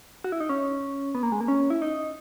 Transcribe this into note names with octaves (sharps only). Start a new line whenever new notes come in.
F#4
E4
D#4
C#4
B3
A#3
G#3
A#3
C#4
E4
D#4